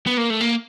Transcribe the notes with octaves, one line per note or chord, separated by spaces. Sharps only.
B3
A#3
A3
A#3